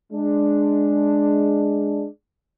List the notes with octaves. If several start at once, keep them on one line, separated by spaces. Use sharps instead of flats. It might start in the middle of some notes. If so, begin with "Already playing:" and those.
G#3 D4